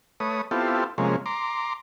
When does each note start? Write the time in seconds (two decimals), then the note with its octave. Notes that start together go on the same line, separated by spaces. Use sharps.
0.20 A3 B4 C#5 D#6
0.51 B3 C4 E4 F4 G4 A4
0.98 C3 F3 G#3 A#3 C#4
1.26 A#5 C6 D6